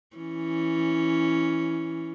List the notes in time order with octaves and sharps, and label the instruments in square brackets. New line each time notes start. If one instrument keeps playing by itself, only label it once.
[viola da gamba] E3 C#4